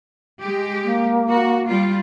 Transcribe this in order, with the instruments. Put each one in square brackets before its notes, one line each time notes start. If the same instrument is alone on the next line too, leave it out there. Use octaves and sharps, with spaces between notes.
[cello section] G#3 G4
[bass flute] A#3
[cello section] F#4
G3 F4